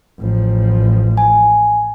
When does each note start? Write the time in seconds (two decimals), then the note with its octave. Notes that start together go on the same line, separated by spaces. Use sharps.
0.20 A1 F3
1.18 G#5